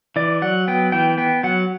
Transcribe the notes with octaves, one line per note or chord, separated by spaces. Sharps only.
E3 D5
F#3 F#5
B3 G5
E3 G5
B3 G5
F#3 F#5